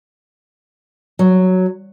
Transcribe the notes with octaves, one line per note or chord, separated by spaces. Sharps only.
F#3